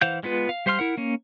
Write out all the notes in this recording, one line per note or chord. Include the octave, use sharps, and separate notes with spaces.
E3 C5 F5 F#5 G6
G#3 B3 F4 B4
F5
G3 C5 F5 C6 F6
E4 A#4 F#5
A#3 C#4